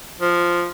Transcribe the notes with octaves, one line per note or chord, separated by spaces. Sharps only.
F3